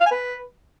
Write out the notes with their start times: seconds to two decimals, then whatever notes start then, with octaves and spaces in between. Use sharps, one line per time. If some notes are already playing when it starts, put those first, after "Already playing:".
0.01 F5
0.06 G#5
0.11 B4